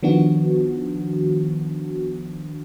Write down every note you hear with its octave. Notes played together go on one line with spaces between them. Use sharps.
D#3 F3 B3 D4 F#4